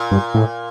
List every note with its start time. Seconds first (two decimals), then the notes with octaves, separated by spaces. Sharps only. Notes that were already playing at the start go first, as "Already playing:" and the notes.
Already playing: A#2
0.11 G2
0.34 A2